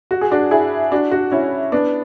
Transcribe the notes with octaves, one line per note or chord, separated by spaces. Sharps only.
F#4
G#4
D4 F#4
E4 G#4
D4 F#4
D4 F#4
C#4 E4
B3 D4